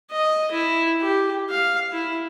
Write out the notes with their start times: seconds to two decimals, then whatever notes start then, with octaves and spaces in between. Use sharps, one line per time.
0.12 D#5
0.52 E4
1.02 G4
1.50 F5
1.93 E4